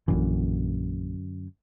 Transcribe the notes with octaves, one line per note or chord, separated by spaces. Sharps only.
A#1 F#2 A#2 D3 E3